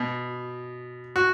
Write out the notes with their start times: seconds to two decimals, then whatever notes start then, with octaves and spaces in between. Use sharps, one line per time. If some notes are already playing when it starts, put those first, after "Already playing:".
Already playing: B2
1.16 F#4